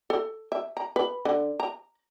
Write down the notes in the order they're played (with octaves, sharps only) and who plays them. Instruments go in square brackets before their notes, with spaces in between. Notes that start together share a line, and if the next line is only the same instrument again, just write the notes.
[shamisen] A4
E5
A#5
B4
D3
A#5